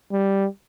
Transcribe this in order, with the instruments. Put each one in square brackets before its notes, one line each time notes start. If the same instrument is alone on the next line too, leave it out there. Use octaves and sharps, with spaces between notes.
[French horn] G3